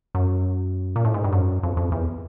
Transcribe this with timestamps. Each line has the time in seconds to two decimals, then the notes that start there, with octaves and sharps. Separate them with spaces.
0.15 F#2
0.96 A#2
1.05 A2
1.14 G#2
1.24 G2
1.33 F#2
1.63 F2
1.77 F2
1.92 E2